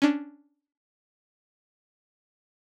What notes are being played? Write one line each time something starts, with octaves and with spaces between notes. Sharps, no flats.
C#4 D4